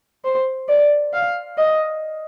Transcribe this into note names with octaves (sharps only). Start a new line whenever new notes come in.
C5
D5
F5
D#5